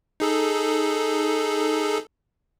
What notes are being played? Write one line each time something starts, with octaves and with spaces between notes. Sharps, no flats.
D#4 G#4 A4